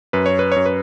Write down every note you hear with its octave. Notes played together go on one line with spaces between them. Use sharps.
F#2 B4
C#5
B4
F#2 C#5
B4